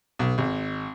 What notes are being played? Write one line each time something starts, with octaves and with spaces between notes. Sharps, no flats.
B1
G#1